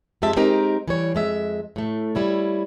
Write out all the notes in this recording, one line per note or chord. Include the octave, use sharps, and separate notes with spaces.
F2 F3 G#3 G4 E5 A5
G#3 C4 D#4 G4 A#4 A#5
E3 G3 C#5
F2 G#3 E5
A2 A3
G3 E4 C#5